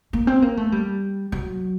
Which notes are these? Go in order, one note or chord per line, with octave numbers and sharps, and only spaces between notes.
A#3
C4
A#3
A3
G3
F#3